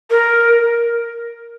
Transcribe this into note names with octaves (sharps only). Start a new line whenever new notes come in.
A#4